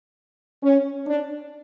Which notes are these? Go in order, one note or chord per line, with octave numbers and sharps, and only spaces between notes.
C#4
D4